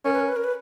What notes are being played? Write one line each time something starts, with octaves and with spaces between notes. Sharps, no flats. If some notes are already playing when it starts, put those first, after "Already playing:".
C#4 A#4
B4
A#4
B4
A#4
B4